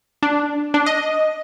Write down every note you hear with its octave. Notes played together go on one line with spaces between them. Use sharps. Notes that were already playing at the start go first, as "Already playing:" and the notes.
D4
D4
D#5